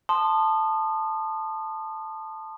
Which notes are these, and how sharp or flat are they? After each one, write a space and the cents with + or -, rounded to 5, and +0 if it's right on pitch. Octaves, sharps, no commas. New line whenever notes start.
A5 +0 C6 +0 D#6 -30